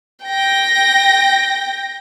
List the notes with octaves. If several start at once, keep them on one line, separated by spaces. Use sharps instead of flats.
G5 A#6